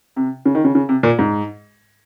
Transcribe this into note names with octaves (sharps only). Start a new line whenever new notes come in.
C3
C#3
D#3
C#3
C#3
C3
A#2
G#2